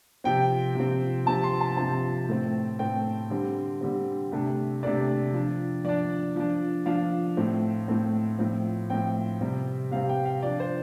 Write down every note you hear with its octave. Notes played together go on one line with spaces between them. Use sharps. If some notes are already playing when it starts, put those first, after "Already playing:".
C3 F3 C4 G5
C3 F3 C4
C3 F3 C4 A5
C6
A5
C3 F3 C4 A5
A2 A3 C4
A2 A3 C4 G5
D3 G3 C4
D3 G3 C4
C3 A3 D4
C3 A3 D4 D5
F3 D4
F3 D4 D5
F3 D4
F3 D4 F5
A2 A3 C4
A2 A3 C4
A2 F3 C4
A2 F3 C4 G5
C3 G3 C4
C3 G3 C4 F5
G5
F5
F3 D4 D5
C5